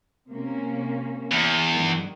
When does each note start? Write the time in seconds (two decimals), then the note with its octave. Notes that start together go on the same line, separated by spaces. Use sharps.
0.30 C3 A#3 C#4
1.31 E2
1.72 G2 D#3